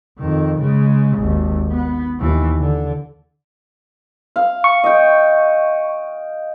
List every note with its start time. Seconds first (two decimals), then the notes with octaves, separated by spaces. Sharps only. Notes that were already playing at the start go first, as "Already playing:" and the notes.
0.18 F2 D#3
0.59 C#3 G#3
1.18 G#1 D#2
1.71 B3
2.19 D#2 E3
2.59 D3
4.36 F5
4.64 C#6
4.84 D#5 G5